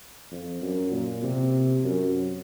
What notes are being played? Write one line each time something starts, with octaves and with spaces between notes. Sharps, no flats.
F2
F#2
A#2
C3
F#2